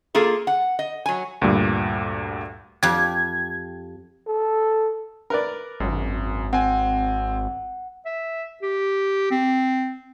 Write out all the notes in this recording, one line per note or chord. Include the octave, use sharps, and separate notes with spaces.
A#3 F4 G#4 A4
F#5
D#5
F#3 G#5
D2 G2 A#2 G3
F2 G4 G#6
A4
A#4 B4 D5
G#1 F#2
C4 F#5 G#5
E5
G4
C4